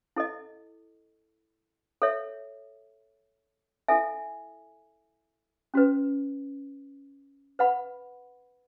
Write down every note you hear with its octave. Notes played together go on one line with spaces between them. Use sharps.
E4 A4 D#5
A4 C#5 E5
E4 A4 E5 G#5
C#4 F#4 B4
B4 F#5 B5